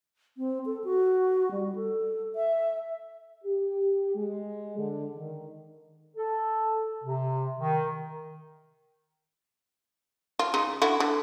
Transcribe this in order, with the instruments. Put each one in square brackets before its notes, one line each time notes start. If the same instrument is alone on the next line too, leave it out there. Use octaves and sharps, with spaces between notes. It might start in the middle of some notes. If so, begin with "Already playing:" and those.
[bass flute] C4
A4
F#4
G3
A4
E5
[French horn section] G4
G#3
D3
D#3
[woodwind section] A4
C3
D#3
[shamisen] F4
C#3 D#4
D3 E4 F#4
D3